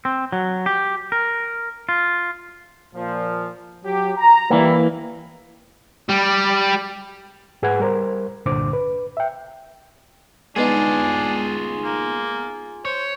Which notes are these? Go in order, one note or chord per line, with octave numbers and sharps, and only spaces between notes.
C4
F#3
G4
A#4
F4
A#2 F3
F#3 G4
A#5
E3 G3 A#3 E4
G3
G#2 G#4 B4 F#5 G#6
G3 A#4 C5
C2 G2 A#2 D3 C5 D6
B4
E5 G5
G#3 B3 D4 D#4 F4 G#4
A#3
C5 C#5